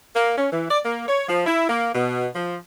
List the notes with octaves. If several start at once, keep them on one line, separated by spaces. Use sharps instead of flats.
A#3
C#4
E3
D5
A#3
C#5
F3
E4
A#3
B2
F3